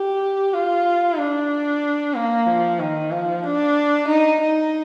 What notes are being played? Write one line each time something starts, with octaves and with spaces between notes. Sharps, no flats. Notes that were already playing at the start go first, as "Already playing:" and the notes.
Already playing: G4
F4
D4
A#3
F3
D#3
F3
D4
D#4
D#4